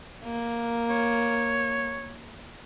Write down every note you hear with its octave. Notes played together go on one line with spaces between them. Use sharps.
A#3
C#5